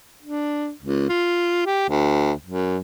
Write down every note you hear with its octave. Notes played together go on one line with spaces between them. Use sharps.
D4
C#2
F4
G4
D2
F#2